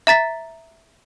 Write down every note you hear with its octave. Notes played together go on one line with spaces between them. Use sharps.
E5 A#5 A6 B6